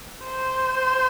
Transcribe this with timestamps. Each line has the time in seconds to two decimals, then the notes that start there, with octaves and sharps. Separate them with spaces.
0.24 C5